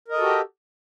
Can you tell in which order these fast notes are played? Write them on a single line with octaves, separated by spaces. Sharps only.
A#4 D#5 A4 F#4 G4